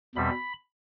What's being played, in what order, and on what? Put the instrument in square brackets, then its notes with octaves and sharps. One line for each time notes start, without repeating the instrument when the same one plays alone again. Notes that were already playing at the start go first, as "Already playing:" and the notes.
[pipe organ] E2 B2 G3 C4 B5